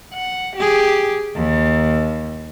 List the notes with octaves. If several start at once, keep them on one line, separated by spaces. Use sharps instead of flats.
F#5
G4 G#4
D#2